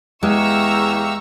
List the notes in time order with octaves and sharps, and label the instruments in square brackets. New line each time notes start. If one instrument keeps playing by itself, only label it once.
[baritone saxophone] E2 [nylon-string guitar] G#3 [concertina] G4 E5 F5 [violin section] A#5 C#6 E6